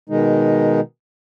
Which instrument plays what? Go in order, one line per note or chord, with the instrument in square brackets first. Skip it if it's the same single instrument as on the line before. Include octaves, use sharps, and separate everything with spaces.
[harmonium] B2 D#3 G#3 D#4